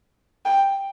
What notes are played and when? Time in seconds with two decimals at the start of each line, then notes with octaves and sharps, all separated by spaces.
0.45 G5